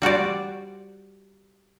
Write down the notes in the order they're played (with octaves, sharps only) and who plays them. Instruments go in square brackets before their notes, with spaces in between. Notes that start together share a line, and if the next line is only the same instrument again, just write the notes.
[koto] G3 F#4 C5 D5